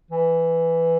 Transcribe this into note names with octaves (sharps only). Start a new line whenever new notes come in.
E3